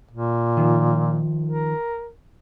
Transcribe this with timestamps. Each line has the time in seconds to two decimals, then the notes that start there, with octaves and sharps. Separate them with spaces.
0.11 A#2
0.57 D#3 F3
1.46 A#4